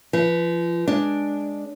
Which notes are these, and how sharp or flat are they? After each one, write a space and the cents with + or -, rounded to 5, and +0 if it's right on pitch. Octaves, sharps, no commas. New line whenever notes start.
F3 -30 B4 +0
G#3 +0 D4 +0